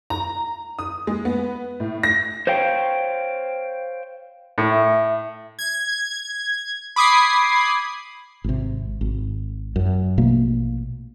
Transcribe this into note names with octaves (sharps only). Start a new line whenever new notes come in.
A#5
D#6
G#3
B3
A2
A#6
C5 C#5 F5 G5
A2
E5
G#6
B5 D6 D#6 G#6 C7
G#1 C3
G#1
F#2
A#1 B2 A3 A#3